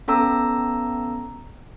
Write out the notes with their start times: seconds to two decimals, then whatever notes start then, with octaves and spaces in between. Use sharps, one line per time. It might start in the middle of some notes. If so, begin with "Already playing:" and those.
0.08 B3 C#4 A4 A#5 E6